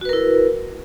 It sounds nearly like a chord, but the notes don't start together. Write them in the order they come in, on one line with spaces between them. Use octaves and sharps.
F#4 B4 A#4 E4